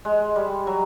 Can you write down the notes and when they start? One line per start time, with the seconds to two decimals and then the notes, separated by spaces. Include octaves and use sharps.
0.05 G#3
0.36 G3
0.67 F#3